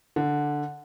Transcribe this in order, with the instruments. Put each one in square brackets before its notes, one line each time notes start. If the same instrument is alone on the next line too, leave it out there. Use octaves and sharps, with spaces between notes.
[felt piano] D3